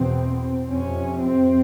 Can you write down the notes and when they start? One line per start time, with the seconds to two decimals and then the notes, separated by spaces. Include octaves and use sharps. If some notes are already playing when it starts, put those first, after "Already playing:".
Already playing: E2 B2 C4
0.69 F2 C3 C#4
1.22 C4